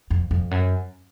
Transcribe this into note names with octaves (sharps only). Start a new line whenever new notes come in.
F2
F2
F#2